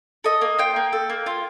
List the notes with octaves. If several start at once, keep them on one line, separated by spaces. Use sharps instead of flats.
A4 D#5
A#3
F4 G5
A#3
A4
A#3
F4